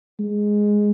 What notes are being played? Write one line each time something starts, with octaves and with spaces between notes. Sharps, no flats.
G#3